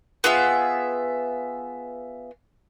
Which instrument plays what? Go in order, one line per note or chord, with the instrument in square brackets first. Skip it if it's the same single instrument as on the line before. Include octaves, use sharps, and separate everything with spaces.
[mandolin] B3 F4 G#4 E5